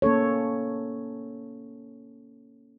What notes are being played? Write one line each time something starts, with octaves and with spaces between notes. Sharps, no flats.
A#3 C#4 A4 C#5